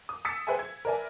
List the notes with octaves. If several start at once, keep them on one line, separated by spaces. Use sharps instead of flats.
D#6
D#6 E6 A6 B6 C#7
G#4 B4 C5 E5 G5 G#5
G#6
A#4 B4 D5 E5 G#5